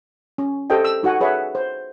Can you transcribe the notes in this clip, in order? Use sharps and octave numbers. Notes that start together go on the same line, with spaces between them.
C#4
G4 A4 C5 D#5 G5
E6
D#4 F#4 A4 F#5 G#5
G#4 B4 C#5 E5 F#5
C5